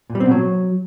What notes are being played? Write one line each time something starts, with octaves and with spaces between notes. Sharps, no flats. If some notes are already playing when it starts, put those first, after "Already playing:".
A#2
G3
C4
B2
F#3